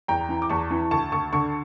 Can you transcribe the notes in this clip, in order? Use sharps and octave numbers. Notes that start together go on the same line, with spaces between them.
E2 G5 A#5
E3
D6
E2 A5 C#6
E3
D2 A5 C#6
D2 A5 C#6
D3 A5 C#6